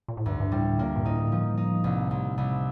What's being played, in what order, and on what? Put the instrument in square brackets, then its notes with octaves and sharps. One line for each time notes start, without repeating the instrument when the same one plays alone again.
[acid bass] A#2
A2
[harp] D2 [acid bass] G2
[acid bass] G2
[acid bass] A2 [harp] G3
[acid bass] A#2 [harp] A#3
[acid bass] G2
[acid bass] A2 [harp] D#4
[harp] F3
D#4
C2
C2
C2